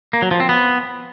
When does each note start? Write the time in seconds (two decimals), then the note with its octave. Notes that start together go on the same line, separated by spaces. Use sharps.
0.13 A#3
0.22 F#3
0.31 F3
0.40 C4
0.49 B3